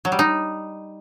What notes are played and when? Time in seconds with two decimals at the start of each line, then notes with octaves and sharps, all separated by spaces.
0.05 F#3
0.12 G3
0.19 D#4